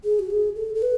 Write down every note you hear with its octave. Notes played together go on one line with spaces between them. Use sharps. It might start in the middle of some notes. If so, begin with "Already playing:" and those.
G#4
F#4
G#4
A4
A4
B4